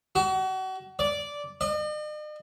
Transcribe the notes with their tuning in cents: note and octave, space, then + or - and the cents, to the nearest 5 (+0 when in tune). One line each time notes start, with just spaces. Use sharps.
F#4 +35
D5 -10
D#5 -45